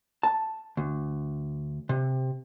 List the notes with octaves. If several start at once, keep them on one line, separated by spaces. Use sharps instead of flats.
A5
D2
C3